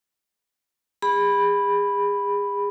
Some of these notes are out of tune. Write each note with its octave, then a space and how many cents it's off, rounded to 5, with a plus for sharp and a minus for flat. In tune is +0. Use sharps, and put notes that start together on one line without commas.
G#4 -35 B5 +0